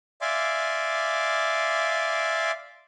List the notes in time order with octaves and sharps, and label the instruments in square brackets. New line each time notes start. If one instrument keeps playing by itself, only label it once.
[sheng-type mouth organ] D5 E5 F5 G#5 C6 D6